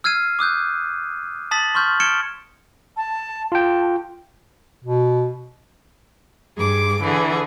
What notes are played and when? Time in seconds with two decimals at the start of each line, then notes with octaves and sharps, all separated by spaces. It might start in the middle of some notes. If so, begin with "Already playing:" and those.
0.04 E6 F6 G#6 C7 D#7
0.39 D6 D#6 F#6 G6
1.51 A5 D#6 A6 B6 F#7
1.75 C6 C#6 F6 G6
2.00 F6 G#6 C#7 D7 E7 G7
2.97 A5
3.52 F4 G5 A5
4.84 B2
6.56 G2 G#4 D6
7.02 D3 E3 G#4